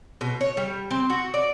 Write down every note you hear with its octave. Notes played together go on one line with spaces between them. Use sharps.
B2
C#5
G3
C4
F#4
D5